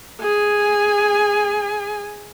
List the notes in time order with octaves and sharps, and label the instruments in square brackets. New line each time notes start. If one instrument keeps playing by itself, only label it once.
[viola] G#4 G#5